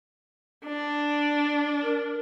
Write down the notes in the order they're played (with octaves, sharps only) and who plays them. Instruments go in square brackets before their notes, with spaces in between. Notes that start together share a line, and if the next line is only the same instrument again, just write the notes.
[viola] D4
[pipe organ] A#4